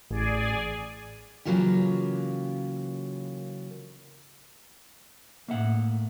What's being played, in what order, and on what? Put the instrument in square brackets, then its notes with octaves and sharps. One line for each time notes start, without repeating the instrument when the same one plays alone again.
[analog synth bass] A1 [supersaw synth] G#4 D5 G#5
[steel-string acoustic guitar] C#3 E3 F#3 A#3 F4 G4
[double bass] A2 [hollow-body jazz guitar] A#3 E5 F#5